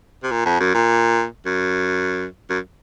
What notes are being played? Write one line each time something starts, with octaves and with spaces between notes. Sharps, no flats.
C3
A#2
F2
F#2
A#2
F#2
F#2